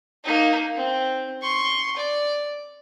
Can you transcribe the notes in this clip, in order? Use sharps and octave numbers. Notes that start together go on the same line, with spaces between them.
A#3 D#4
C4
C6 C#6
D5